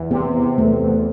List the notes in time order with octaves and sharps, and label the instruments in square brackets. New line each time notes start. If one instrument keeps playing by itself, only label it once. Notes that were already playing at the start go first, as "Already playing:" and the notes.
Already playing: [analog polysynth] E2
[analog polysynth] C3 [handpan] B3
[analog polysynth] C3
[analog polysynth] E2 [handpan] A3
[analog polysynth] E2